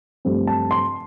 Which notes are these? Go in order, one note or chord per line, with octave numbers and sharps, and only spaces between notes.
G2 F3 A3 C4
A5
C6